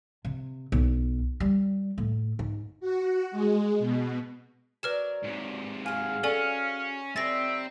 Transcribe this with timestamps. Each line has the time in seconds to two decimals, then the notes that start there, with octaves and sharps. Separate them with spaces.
0.25 C3
0.72 B1
1.40 G3
1.98 A2
2.39 G#2
2.80 F#4
3.31 G#3
3.79 B2
4.83 F#3 A#4 B4 D5 F6 E7
5.23 G#2 C3
5.86 F#4 G#4 F5 G#5
6.23 C#4 A4 D5 G#5
7.16 D3 G3 C4 D#4 E5 A6 A#6